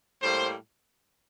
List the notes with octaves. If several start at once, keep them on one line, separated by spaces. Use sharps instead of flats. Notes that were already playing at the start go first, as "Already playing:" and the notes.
A2 G3 A#3 C5